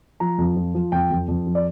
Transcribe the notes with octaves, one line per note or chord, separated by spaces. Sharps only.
F3 A#5
F2
F3
F3
F2 G5
F2
F2
F3
D5